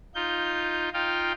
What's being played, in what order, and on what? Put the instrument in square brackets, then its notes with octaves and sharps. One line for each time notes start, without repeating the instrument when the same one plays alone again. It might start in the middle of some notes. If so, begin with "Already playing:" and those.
[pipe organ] D#4 F4 G6
D#4 F4 F5 G5